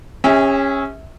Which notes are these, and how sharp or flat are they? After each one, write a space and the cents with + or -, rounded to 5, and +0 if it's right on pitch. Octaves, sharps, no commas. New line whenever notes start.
C#4 -10 G#4 -45 E5 -25